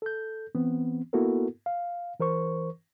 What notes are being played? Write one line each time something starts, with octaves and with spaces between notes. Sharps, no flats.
A4 G6
E3 B3 C4
A#3 B3 E4 F#4 A4 A#4
F5
E3 A#4 C5 C#6